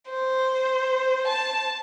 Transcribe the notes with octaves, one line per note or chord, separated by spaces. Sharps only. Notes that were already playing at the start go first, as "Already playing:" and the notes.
C5
A5